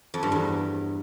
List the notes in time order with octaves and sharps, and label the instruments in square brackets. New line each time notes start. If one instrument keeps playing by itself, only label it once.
[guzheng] F2
G2
E2